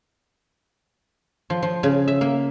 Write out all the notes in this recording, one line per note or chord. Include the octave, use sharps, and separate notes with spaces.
F3
F3
C#3
E5
A#3